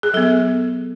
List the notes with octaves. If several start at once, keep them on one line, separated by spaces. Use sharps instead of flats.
G#4
F#3 B3 A4